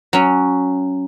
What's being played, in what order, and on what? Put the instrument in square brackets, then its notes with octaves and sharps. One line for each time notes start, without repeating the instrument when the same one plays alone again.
[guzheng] F#3 C#4